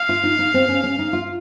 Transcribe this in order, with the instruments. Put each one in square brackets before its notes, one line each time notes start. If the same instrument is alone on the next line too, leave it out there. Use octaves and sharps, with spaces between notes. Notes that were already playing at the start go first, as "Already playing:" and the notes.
Already playing: [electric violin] F5
[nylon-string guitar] F4
D#4
D#4
C4
C#4
C#4
D#4
F4